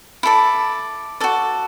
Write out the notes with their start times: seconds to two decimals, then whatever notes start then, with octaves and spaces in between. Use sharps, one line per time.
0.23 E4 A4 D5 B5
1.20 F#4 A4 D5